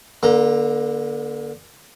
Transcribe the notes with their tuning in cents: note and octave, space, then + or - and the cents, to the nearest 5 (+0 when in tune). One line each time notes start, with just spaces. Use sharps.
D3 -5 A#3 +40 A#5 +0